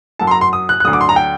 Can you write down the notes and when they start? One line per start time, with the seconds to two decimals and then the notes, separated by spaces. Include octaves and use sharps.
0.19 F#2 F#3 A5
0.27 C6
0.31 A#5
0.41 C6
0.53 D#6
0.69 F#6
0.80 F#6
0.84 D2 D3 F#3 D#6
0.93 D6
1.01 C6
1.09 A#5
1.16 G5